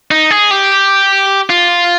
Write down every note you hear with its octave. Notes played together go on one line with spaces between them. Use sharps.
D#4
G#4
G4
F4